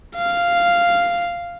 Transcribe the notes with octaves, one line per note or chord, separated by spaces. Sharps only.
F5